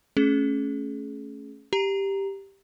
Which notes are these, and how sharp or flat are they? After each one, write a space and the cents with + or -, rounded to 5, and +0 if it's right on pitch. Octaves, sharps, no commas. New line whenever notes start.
A3 +0 C#4 +0 G#4 +30
G4 +0 A#5 +0